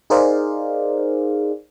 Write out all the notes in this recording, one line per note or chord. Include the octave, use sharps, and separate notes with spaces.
D#4 G#4 A#4 C5 D5 F5